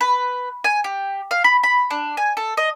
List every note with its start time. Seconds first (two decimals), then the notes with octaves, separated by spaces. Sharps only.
0.01 B4
0.64 G#5
0.84 G4
1.31 F5
1.44 B5
1.63 B5
1.90 D4
2.17 G#5
2.37 A4
2.57 D#5